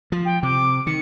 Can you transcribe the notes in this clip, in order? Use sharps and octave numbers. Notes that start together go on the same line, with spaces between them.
F3
G5
C3 D6
D#3 C#7